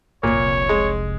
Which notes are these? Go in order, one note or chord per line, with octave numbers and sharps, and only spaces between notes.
F1 C2 A#2 C#5
G#3